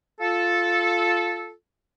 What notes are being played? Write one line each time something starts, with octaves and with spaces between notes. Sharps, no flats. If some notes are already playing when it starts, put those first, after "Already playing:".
F4 A4